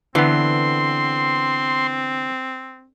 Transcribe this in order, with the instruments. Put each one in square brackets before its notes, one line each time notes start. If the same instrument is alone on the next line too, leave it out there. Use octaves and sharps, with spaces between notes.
[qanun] D3 [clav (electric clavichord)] E3 B3 [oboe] C4 [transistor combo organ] C6